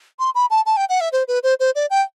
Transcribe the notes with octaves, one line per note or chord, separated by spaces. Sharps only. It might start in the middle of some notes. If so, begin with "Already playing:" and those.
C6
B5
A5
A5
G5
F#5
E5
C5
B4
C5
C5
D5
G5